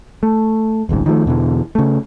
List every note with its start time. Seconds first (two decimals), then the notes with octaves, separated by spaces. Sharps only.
0.23 A3
0.89 D#1 G#1 C#2 G#2
1.06 D#3 F3 F#3 A3
1.26 E2 B2 D3 E3
1.75 C#3 A3